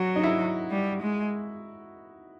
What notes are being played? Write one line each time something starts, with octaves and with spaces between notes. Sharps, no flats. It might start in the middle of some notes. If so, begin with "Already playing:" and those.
Already playing: F#3 F#4
D#4
E4
G3
G#3